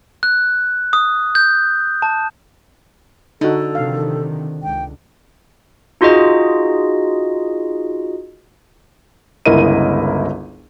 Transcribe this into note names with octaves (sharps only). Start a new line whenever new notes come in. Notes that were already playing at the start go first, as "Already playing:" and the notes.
F#6
D#6
G6
A5
D3 D#4 F#4 A4
C3 D#3 F3 F5
C#2 G5
D#4 F4 F#4 G#4 D#5
G1 C#2 E4 A#4 D#5 D#7